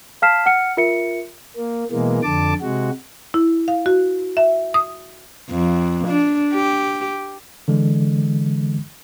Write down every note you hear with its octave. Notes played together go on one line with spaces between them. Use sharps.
F5 A5 F6 B6 C7 E7
F#5 F6 C#7
F4 A#4 E5 C#7
A#3
B2 E3 G#3 A#3
F2 D3 A5 D6
C3 G#3 F#4
E4
F5
F#4
E5
D#6
F2
D4
G4
D3 E3 G#3